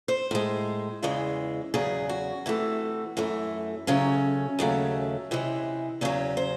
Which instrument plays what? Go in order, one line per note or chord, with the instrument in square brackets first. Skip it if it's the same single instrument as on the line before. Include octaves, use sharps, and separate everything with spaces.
[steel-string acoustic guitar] C5
A2 G#3
E2 C#3 E3 G#3
E2 C#3 F#3 G#4
F#4
C3 E3 A3
F#2 E3 A3
F#2 C#3 F#3 A3 C#4
D#2 C#3 F#3 A3
C3 E3 G#3
E2 C#3 F#3 C#4
C5